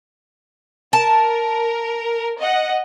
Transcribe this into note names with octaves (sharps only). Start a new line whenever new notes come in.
A#4 A5
D#5 F#5